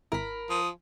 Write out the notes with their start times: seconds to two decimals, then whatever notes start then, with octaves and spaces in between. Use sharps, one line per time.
0.12 G#1 E4 A#4 B5
0.50 F3 D#6